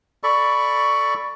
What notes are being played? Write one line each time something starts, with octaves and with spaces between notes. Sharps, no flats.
A4 D5 B5 C#6